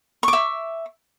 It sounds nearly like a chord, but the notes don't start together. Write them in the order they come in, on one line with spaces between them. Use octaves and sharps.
C#6 D6 E5